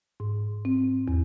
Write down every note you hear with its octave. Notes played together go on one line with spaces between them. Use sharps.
G#2
C4
E2